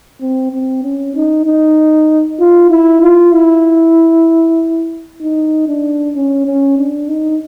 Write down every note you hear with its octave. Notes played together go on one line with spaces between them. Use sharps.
C4
C4
C#4
D#4
D#4
F4
E4
F4
E4
D#4
D4
C#4
C#4
D4
D#4